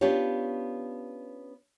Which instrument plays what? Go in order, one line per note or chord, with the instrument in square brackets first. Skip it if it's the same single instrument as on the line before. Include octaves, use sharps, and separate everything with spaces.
[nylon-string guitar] B3 C#4 D4 F4 G4 C#5